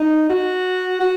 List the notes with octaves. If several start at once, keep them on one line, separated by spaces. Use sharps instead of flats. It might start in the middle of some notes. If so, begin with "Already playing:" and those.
Already playing: D#4
F#4
F#4